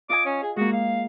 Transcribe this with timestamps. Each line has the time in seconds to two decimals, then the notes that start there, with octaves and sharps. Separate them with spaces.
0.09 F4 D#5 G#5 D6
0.25 C#4
0.43 G#4
0.56 G#3 A#3 F#4
0.72 F5